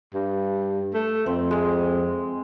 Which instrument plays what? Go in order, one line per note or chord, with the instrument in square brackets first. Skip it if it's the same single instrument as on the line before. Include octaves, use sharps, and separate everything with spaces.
[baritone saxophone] G2
A3
[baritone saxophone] F2 [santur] C4
[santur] G#3